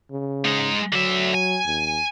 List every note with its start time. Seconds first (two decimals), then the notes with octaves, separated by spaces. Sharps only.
0.11 C#3
0.45 G#3 D#4
0.93 D3 F#3 E5
1.35 G#5
1.66 D#2